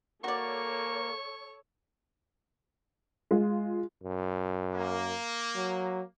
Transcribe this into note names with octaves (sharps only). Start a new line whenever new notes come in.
A#3 F#4 A4 C#5 D5 C#6
G#3 F4
F#2
A#3
F#3